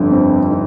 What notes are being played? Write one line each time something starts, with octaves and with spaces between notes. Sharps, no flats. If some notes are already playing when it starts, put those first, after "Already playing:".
Already playing: G1 F2 D3
C4
D#4